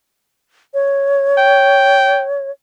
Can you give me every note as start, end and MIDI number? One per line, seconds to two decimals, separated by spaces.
0.74 2.50 73
1.38 2.25 79